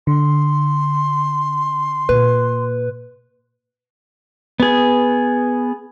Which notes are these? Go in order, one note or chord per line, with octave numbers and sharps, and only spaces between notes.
D3 C6
A#2 B4
B3 G#4